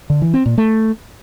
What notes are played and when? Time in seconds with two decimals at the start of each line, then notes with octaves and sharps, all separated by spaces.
0.10 D3
0.22 E3
0.34 C4
0.46 A#2
0.58 A3